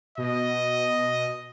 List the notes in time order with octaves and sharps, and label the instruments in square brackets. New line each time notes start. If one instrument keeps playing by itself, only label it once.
[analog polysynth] B2 [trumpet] D#5